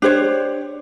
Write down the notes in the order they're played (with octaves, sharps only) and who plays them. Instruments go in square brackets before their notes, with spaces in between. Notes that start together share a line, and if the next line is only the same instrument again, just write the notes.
[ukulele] D4 G4 C5 C#5